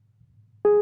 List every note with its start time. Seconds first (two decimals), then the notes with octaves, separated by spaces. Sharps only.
0.65 G#4